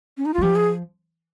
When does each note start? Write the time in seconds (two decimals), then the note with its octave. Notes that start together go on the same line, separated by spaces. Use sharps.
0.17 C#4
0.26 D#4
0.34 F4
0.38 G3
0.42 F3 G4
0.56 G#4